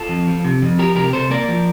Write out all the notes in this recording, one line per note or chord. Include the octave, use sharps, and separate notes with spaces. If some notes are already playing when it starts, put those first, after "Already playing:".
Already playing: F4 A4
F2
F3
C3
F2
F3 G4 A#4
C3 G4 A#4
C3 A4 C5
A#3 A#4 D5
F3